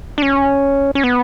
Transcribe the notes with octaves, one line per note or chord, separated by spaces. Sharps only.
D4
C#4
C#4
B3